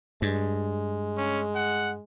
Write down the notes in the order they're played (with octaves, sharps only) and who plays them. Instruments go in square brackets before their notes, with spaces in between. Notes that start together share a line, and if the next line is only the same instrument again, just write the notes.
[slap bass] G2 [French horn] G#3
[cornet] C#4
F#5